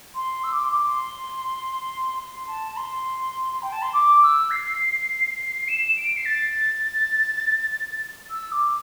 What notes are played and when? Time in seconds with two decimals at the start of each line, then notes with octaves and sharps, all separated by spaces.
0.14 C6
0.43 E6
0.52 D6
0.63 C6
0.71 D6
0.86 C6
2.18 C6
2.47 A5
2.72 A5
2.77 C6
3.62 G5
3.72 A5
3.82 C6
3.93 D6
4.22 E6
4.50 C7
5.68 E7
5.96 D7
6.16 C7
6.25 A6
8.30 E6
8.52 D6